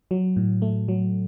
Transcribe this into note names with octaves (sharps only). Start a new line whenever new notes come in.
F#3
A2
A3
F#3